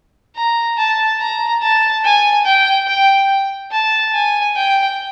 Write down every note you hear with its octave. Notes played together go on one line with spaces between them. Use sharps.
A#5
A5
A#5
A5
G#5
G5
G5
A5
G#5
G5